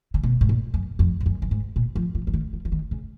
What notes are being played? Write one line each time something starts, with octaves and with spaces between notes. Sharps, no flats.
C#3
B2
G#2
A#2
F#2
F2
G#2
F#2
F#2
G#2
A#2
F3
F3
F3
D#3
F3
F3
D#3
C#3